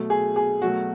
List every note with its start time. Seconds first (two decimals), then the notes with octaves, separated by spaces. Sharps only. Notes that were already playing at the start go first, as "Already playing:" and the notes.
Already playing: B2 F#3 A3
0.10 G#4
0.36 G#4
0.62 B2 F#3 A3 F#4